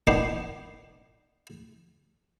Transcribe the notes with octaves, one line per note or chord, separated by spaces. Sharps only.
A#2 D#3 B3 D4 C5 C6